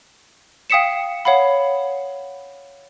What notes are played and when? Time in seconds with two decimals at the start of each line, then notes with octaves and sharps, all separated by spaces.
0.70 F5 G5 D#6 B6 C#7 E7
1.25 C#5 F5 F#5 B5